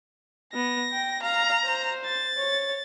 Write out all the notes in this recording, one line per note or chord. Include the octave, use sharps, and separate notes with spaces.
B3 A#6
G5
F5 A#5
C5
A6
C#5